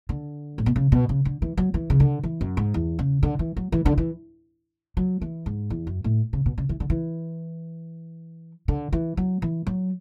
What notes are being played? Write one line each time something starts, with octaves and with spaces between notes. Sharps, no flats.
D3
A2
B2
C#3
B2
C#3
D3
E3
F#3
E3
C#3
D3
E3
F#2
G#2
E2
C#3
D3
E3
F#3
E3
D3
E3
F#3
E3
G#2
E2
F#2
A2
C#3
B2
C#3
E3
D3
E3
D3
E3
F#3
E3
F#3